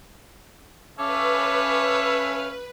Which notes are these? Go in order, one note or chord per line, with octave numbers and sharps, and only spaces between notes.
C#4 A4 B4 C#5 E5 F5 D6